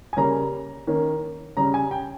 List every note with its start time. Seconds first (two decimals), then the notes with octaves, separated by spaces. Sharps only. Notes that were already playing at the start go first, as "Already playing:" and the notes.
0.13 G#5
0.17 C#3 G3 A#3 C#4 A#5
0.87 D#3 A#3 C#4
1.57 C#3 G3 C#4 A#5
1.74 G#5
1.91 G5